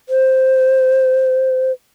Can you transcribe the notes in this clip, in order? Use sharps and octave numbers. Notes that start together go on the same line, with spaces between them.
C5